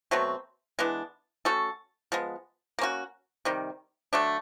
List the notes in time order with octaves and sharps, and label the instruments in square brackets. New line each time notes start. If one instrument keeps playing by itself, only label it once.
[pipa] B2 F#3 A3 C4
E3 G#3 B3 D4
A3 C#4 F#4 A4
F3 G#3 B3
A#3 C#4 F#4
C3 D#3 G3
D3 F#3 A3 D4